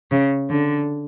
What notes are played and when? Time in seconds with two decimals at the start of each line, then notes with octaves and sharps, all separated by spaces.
0.11 C#3
0.50 D3